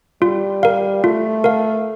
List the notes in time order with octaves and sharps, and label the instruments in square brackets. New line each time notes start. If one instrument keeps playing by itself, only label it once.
[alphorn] G3 [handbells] F4
[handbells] A#4 F5
[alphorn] A3 [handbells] F4
[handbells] A#4 F5